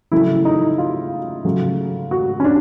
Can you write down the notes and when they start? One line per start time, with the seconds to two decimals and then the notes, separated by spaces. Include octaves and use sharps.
0.12 C#3 F#3 A3 E4
0.45 D#4
0.78 F4
1.45 C#3 F#3 A3
2.11 F#4
2.40 C#4
2.44 D4